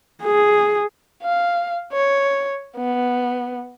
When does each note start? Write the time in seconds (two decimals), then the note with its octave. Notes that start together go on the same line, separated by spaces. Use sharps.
0.24 G#4
1.22 F5
1.93 C#5
2.77 B3